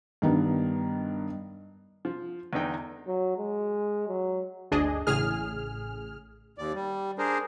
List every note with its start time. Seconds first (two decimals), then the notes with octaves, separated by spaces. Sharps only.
0.22 G2 D#3 B3
2.05 F3
2.53 E2 D3 B3 D#4 G5
3.07 F#3
3.37 G#3
4.08 F#3
4.71 G1 D2 D4 G#4 D#5
5.07 A1 A2 C#3 G#4 F6
6.58 D#2 D5
6.74 G3
7.18 D4 G#4 A#4 C5